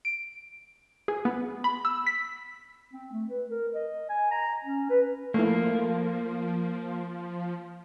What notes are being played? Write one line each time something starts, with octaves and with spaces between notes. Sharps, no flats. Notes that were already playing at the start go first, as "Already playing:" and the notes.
D7
G#4
B3
B5
E6
B6
C4
A3
B4
A#4
D#5
G#5
A#5
C#4
B4
F3 A3 A#3 E4